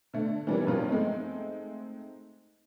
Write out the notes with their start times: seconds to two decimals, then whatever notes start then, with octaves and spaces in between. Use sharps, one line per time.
0.14 D3 A3
0.47 E3 G3 A#3 C#4
0.67 G2 F3 F#3 A#3 C4 F4
0.88 G#3 A3 C4 D#4